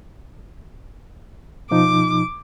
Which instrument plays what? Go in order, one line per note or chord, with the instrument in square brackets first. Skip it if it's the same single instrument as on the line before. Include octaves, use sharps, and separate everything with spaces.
[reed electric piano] B2 F3 D#4 [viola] D6